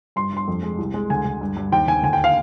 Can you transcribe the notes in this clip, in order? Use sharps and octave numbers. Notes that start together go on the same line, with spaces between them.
G2 C6
G2 C6
F2
G#3
C2
G#3
D2 G#5
D2
G2
G2
D#2 G5
D#2 G#5
D2 G#5
G5
F5